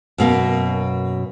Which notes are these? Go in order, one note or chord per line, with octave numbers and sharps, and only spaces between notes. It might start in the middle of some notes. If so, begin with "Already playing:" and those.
F#2 B2 A#3